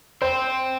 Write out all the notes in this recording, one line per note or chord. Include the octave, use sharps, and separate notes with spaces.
C4 C5